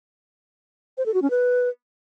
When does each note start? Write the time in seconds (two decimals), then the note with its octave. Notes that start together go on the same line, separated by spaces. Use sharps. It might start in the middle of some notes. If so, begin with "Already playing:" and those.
0.98 C5
1.06 A4
1.14 F#4
1.22 C#4
1.30 B4